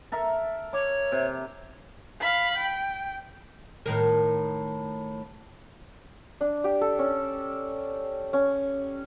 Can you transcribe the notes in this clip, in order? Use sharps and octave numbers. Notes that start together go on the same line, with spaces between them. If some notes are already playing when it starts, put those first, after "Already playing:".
A4 A#4 E5
C#5 D6
C3
F5 B5
G5
A2 D#3 A#4
D4
G4
A4
C#4
C#4